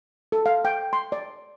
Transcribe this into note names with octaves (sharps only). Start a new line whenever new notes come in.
A4
F5
G5
C6
D5